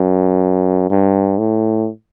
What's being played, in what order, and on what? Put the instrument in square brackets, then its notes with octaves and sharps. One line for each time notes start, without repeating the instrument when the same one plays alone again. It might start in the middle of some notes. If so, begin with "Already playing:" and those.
Already playing: [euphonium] F#2
G2
A2